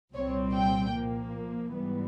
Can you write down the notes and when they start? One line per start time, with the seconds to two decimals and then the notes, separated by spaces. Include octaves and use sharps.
0.14 C2 A#2 G3 C4 C#5
0.53 G5
0.93 A#2 F3 A#3
1.72 G#2 E3 G3 B3